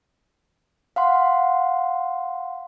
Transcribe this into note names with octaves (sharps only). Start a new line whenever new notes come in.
F5 F#5 C6